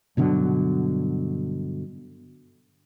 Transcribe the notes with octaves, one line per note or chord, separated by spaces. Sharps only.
G2 B2 D3 F#3